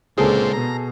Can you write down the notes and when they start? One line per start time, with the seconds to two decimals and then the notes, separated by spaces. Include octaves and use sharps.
0.18 C#2 A#2 D3 C4 G#4 A4
0.53 B2 A#5